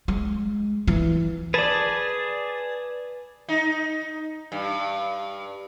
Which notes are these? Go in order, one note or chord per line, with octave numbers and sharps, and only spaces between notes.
G#3
E3
G#4 B4 D5 A5
D#4
G2